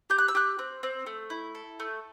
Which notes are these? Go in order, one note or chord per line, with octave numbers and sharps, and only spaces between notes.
G4 G6
F#6
E6
G4 F#6
C4
C4
A3
E4
A4
A3